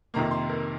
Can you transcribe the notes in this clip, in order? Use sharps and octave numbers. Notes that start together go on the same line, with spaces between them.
F2 C3 D#3 A#3 A#5
C6
A#4